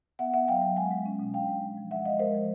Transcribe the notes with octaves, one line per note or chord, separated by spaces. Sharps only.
B3 E5 F#5
B3 E5 F#5
F#3 F5 G5
F#3
G#3 F#5 G#5
G#3
C#4
B2
D4 F5 G5
G#3
G#3
F3
G#3 E5 F#5
G#3 D#5 F5
G#3 A#4 C5
F3